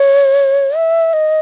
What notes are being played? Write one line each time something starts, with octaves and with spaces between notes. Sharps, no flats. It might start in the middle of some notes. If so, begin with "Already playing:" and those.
Already playing: C#5
E5
D#5